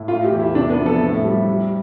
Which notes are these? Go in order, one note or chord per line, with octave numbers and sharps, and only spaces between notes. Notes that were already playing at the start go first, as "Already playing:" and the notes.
Already playing: A2
A3 F4
G4
E2
E4
C3 D4
B3
F3
A4
A2
G3
G3